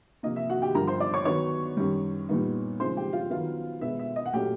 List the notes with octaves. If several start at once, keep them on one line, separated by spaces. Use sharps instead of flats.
C3 F3 A#3 D#5
E5
F#4 F#5
G4 G5
G2 D3 F3 A#4 A#5
C5 C6
D5 D6
C#5 C#6
D#3 F#3 B3 C#5 C#6
F#2 D#3 G3
A#2 G3 B3 D#4
C#3 F3 G#3 C4 D#4 C5 C6
G4 G5
F4 F5
D#3 F#3 B3 F4 F5
B2 G#3 B3 E5
E5
D#5
F#5
A#2 F#3 A3 C#4 G4 G5